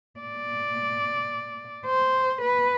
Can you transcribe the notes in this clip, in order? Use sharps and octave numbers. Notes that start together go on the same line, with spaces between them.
D5
C5
B4